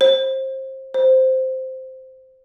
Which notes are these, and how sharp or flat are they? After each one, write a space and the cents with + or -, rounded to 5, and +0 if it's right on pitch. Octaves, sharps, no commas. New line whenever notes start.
C5 +25
C5 -5